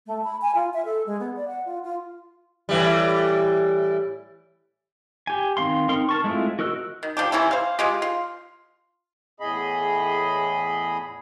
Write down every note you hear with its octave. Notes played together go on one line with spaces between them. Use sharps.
A3
B5
G#5
F4
E5
A4
G#3
B3
D5
F#5
F4
F4
A2 E3 G3
G4 G#5
D#3 C4 F5 C6
C4 D#4 A#4 C6
A#4 A5 C#6
G#3 A3 C4 E4 F4
F#4 A#4 D#5 E6 F#6
D#3
F3 D4 G4
C3 E3 C#4 E4
C5 F5
G#3 F4 G4
F4
E2 A2 G#4 D#5 B5